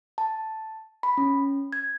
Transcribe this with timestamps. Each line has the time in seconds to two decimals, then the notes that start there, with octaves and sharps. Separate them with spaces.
0.18 A5
1.03 B5
1.18 C#4
1.72 G#6